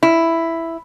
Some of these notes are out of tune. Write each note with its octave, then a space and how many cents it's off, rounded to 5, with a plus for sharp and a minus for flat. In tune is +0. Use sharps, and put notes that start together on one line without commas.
E4 +5